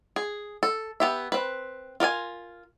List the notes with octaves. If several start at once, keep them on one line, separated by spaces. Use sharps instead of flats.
G#4
A4
B3 G4 E5
C4 B4
F4 A#4 D5 G#5